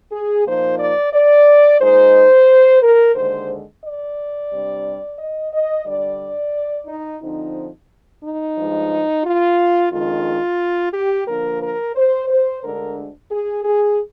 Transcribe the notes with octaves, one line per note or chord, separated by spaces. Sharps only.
G#4
A#2 F3 A#3 D#4 C5
D5
D5
A#2 G#3 D#4 C5
A#4
D#2 D3 G#3 C5
D5
C3 G3 D4
D#5
D#5
D3 G3 D4 D5
D#4
D3 F3 C4 D#4
D#4
G2 F3 G#3
F4
F2 D#3 G#3 D4 F4
G4
D3 F3 A#3 D4 A#4
A#4
C5
C5
D2 D3 G#3 D4 A#4
G#4
G#4